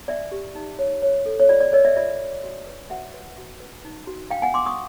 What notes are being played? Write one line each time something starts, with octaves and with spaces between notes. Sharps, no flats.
D4 D5 E5
G4
D#4
C#5
C#5
A4
C#5
F4 D5
D5
A#4 C#5 D#5
D5 E5
F4 D5 E5
F4
F#4
B4
F#4 E5 F#5
B4
F#4
B4
D#4
F#4
D4 F5 G5
F#5 G#5
D4 C6 D6
C#6 D#6